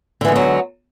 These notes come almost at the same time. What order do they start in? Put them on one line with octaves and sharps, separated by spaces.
D3 E3 G#3 B3 F#3